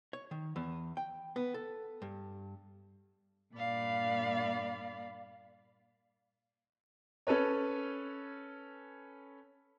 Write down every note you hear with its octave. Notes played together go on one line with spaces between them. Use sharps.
C#5
D#3
E2
G5
B3
A4
G2
G2 A#2 A#3 D5 F5 B5
C#4 A4 B4 C#5